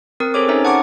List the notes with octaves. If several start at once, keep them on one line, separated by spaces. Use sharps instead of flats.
C4 A#4 D#6
G#4 A4 C5 C#5 D6
C#4 D#4 E5 A#5
F#5 A5 C#6 D6